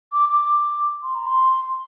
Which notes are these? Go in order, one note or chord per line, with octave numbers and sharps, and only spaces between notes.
D6
D6
C6
A#5
C6